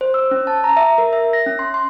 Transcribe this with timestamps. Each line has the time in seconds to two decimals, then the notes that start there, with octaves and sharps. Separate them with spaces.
0.01 C5
0.14 E6
0.31 C#4
0.47 A5
0.64 A#5
0.77 E5
0.98 A#4
1.13 E5
1.33 A#6
1.46 C#4
1.59 C6
1.74 C6